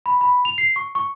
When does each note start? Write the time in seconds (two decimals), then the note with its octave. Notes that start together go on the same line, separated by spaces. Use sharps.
0.06 B5
0.21 B5
0.45 F7
0.58 C7
0.76 C#6
0.95 C#6